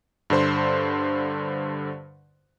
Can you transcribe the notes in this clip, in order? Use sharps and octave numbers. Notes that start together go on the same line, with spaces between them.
G2 D3 C5 C6